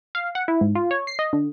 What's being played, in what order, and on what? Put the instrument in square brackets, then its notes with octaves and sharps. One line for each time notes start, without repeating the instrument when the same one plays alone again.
[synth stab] F5
F#5
E4
G#2
F4
C#5
C7
D#5
D3